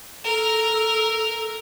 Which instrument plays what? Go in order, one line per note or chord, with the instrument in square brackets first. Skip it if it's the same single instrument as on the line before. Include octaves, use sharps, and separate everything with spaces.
[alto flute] A4 [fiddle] A#4